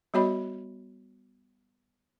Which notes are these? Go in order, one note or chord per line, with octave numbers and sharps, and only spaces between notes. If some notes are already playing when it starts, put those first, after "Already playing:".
G3 B3 F#4 C#5 D#5 B5